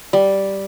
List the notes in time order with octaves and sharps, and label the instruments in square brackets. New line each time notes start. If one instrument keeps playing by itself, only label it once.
[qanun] G3